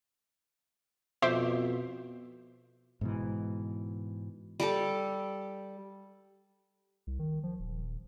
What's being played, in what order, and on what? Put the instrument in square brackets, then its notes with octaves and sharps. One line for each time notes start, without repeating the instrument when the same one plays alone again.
[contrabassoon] F2 [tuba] B2 [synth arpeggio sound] C5 E5 D6
[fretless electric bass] G#2 B2 E3
[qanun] G3 G4 A4
[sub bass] C2
D#3
F3
D#1